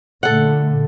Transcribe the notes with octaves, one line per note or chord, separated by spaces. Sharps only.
A#2 D3 A3 A4 F#5